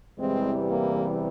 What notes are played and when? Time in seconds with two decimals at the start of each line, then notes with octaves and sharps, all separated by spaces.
0.18 E2 C3 E3 G3 G#3 C4
0.69 A#3